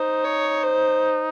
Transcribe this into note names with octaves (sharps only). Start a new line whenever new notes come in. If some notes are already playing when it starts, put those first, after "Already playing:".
Already playing: D#4 C5
C#5
C5